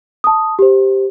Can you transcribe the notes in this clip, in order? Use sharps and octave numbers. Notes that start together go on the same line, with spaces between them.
A5 D#6
G4 C5